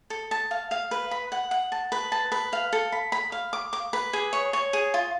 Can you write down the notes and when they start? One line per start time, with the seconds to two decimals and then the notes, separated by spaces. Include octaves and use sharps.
0.10 A4
0.31 A5
0.51 F5
0.71 F5
0.91 B4
1.11 B5
1.32 F#5
1.51 F#5
1.72 A5
1.92 B4
2.12 A5
2.32 B4
2.53 F5
2.73 A4
2.92 B5
3.12 B5
3.32 F5
3.53 D6
3.73 D6
3.93 B4
4.13 G#4
4.33 C#5
4.53 C#5
4.73 G#4
4.94 F4